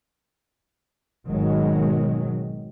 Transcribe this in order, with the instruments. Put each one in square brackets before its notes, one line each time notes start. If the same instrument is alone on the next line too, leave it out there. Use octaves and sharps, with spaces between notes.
[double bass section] G#1 B2 D#3 F#3 G#3